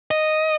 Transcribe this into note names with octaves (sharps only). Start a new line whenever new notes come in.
D#5